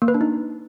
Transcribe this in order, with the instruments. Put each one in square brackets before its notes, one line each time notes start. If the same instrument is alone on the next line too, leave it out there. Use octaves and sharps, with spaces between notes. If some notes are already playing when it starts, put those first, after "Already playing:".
[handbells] A#3
B4
D4
D#4